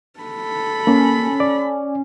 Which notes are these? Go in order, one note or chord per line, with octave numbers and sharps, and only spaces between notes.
A4 B5
A#3 C#4
D5